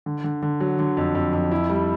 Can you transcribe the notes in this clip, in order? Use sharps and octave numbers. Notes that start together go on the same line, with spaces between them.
D3
D3
D3
F#3
D3
F2
F2
F2
E4
G3